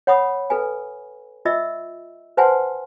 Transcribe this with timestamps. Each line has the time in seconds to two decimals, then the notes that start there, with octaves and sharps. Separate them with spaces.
0.07 C#5 F#5 B5 D#6
0.50 A4 B4 G#5
1.45 F4 D#5 E5 E6
2.37 B4 C5 F#5 G#5 A5 C6